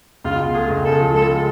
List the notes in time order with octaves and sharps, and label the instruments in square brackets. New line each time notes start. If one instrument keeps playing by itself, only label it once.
[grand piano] C#2 [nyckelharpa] F4
[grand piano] B2
[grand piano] A3 [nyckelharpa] G#4
[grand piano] C#2
[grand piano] C#3 [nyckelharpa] A4
[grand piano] F3
[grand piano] G#3 [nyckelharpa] A4
[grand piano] C#3